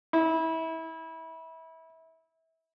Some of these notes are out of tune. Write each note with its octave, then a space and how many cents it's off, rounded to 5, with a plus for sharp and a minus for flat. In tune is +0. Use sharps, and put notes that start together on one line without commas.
E4 -25